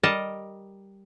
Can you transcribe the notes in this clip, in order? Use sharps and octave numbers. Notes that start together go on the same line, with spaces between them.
G3 A#4 D#5 A5